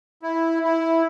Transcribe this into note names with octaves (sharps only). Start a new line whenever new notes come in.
E4
E4